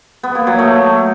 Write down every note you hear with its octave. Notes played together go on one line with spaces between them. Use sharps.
B3
A#3
F#3
A3